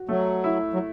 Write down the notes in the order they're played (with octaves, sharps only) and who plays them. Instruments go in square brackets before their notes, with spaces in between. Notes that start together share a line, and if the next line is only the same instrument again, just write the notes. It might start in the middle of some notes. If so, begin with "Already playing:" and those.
Already playing: [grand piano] F#4
[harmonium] F#3 [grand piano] A3
[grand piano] E4
[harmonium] F#3